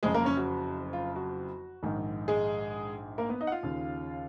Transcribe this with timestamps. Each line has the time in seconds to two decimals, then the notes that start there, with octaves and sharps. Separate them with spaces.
0.03 F#1 F2 C#3 G#3 G#4
0.14 A#3 A#4
0.25 C#4 C#5
0.37 F#4
0.93 F4
1.16 F#4
1.83 A#1 G#2 D#3
2.28 G#3 G#4
3.18 A#3 A#4
3.29 B3 B4
3.41 D#4 D#5
3.47 F#5
3.52 F4 F5
3.63 D#2 C#3